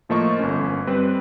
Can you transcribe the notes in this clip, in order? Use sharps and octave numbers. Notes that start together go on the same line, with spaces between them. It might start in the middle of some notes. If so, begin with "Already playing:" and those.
A2 F3 A3 A#3 D#5 C#6
G1 C#4
G3 C4 B4